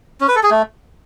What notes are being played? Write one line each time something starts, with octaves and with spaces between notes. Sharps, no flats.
C#4
B4
A4
G#4
A3